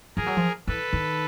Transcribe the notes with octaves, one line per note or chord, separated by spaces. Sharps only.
F3 G#4 A#4
F#3
F3
E3 A4 B4
D#3